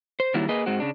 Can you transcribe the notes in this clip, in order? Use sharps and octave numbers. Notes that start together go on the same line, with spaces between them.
C5
D#3 F#3 G3 A#3 E4
A#3 G#4 B4 D#5
G#2 G#3 C4 F#4
C#3 D4